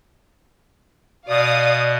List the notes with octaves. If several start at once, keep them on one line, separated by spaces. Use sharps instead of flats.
B2 D5 F5 D#6